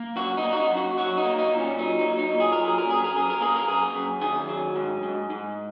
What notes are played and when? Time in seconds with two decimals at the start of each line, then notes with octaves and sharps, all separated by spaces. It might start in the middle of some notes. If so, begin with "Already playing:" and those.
Already playing: A#3
0.16 F#2 F#4
0.37 D#4
0.44 A#3
0.53 F#4
0.57 D#4
0.71 F#2
0.77 F#4
0.98 F#3 F#4
1.17 D#4
1.25 A#3
1.39 D#4
1.52 A#2
1.59 C#4
1.78 F#3 D#4
1.99 D#4
2.06 F#3
2.19 D#4
2.33 A#2
2.40 G#4
2.52 A#4
2.59 F#3
2.65 G#4
2.78 A#4
2.87 F#2 G#4
3.04 A#4
3.14 F#2 G#4
3.30 A#4
3.41 A#3 G#4
3.56 A#4
3.67 F#2 G#4
3.95 F#2
4.21 D#3 G#4
4.49 F#3
4.76 G#2
5.03 G#2
5.30 G#2